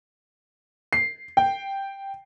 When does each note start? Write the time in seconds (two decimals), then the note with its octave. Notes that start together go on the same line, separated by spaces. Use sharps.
0.93 C7
1.37 G5